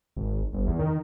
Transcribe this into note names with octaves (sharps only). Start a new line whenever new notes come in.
G#1
G1
E2
D#3